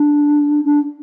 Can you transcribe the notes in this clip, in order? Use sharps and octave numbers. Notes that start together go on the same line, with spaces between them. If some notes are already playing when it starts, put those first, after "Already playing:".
Already playing: D4
D4